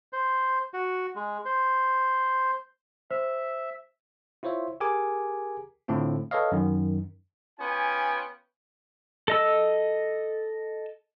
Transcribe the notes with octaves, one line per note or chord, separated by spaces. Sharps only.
C5
F#4
G#3
C5
C5 E5
E4 F4 C5 C#5 E5
G4 G#4 A#4 G#5 D6
A2 D3 C4 F4
A4 B4 C#5 D#5 F5
F#2 D#3
B3 C#4 F4 G5 G#5
A4 D#5 E6